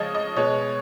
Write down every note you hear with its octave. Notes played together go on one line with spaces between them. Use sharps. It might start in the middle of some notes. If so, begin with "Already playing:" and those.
Already playing: C#3 F3 G#3 C#5 D#5
D#5
B2 G#3 C#5